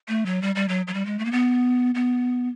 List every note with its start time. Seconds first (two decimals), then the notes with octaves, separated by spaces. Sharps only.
0.08 A3
0.26 F#3
0.42 G3
0.55 G3
0.69 F#3
0.87 F#3
0.94 G3
1.06 G#3
1.19 A3
1.25 A#3
1.32 B3
1.95 B3